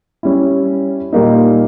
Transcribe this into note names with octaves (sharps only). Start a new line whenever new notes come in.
G3 C#4 E4
A#2 G3 A#3 D#4